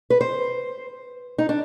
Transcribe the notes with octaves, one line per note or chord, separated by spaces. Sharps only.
B4
C5
D#4
D4